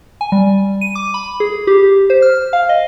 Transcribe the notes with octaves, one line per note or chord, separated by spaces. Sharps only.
G#5
G3
D#7
D6
B5
G#4
G4
C5
F6
F5
D#5